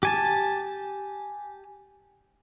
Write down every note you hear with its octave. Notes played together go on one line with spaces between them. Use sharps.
G4 G#5 A5